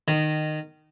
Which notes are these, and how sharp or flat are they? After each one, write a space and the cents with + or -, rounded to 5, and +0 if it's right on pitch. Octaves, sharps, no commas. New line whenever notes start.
D#3 -15